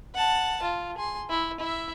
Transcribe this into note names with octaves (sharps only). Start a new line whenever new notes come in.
F#5 A5
F4
G#4 C6
E4
E4 E5